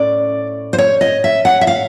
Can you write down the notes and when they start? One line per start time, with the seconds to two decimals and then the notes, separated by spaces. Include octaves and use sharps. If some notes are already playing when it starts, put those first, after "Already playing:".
Already playing: A2 A3 C#4 D5
0.73 C5
0.78 C#5
1.01 D#5
1.24 E5
1.45 F#5
1.61 E5
1.67 F5